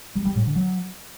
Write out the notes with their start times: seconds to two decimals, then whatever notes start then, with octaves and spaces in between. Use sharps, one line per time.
0.15 G3
0.25 G3
0.35 A2
0.45 D3
0.55 F#3